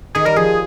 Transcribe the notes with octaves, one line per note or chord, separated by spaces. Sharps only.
D#3 G#4
G3 A#4
F3 G#4